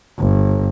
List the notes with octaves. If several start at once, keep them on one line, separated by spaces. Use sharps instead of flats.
G1